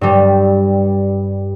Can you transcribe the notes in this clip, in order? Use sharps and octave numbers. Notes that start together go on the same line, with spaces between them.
G2 G3